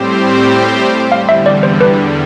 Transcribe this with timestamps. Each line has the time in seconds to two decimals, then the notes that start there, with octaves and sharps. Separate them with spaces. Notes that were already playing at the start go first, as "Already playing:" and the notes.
Already playing: A2 G3 C4 G4 C5
1.11 E2 D3 G3 F5
1.29 E5
1.46 D5
1.63 C5
1.81 B4